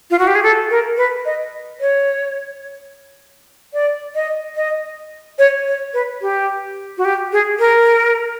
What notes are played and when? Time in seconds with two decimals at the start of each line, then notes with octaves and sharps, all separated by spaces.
0.10 F4
0.19 F#4
0.27 G4
0.35 G#4
0.43 A4
0.70 A#4
0.97 B4
1.25 D#5
1.81 C#5
3.73 D5
4.15 D#5
4.56 D#5
5.39 C#5
5.67 C#5
5.94 B4
6.21 G4
6.98 F#4
7.05 G4
7.32 G#4
7.59 A#4